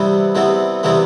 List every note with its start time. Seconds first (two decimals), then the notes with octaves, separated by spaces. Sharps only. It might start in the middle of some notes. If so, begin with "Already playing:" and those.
Already playing: C3 E3 G3 B3
0.35 C3 E3 G3 B3
0.83 C3 E3 G3 B3